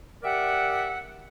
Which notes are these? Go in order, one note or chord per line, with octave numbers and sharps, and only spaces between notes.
G4 A#4 D5 E5 F#5